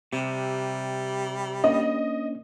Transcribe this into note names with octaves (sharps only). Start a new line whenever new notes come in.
C3 G3
A#3 C#4 D4 D#5